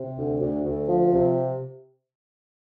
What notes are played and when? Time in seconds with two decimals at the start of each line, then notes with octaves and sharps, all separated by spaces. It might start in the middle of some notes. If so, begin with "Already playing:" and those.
Already playing: C3
0.16 D2
0.41 D2
0.63 D2
0.88 F3
1.12 C3